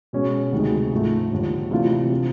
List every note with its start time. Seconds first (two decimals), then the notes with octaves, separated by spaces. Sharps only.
0.13 B2 G#3 C#4
0.52 D2 C3 D#3 G#3
0.92 G#2 F3 A3
1.31 D#2 D3 F3
1.71 C3 E3 A3 D4 F4
2.11 C3 F3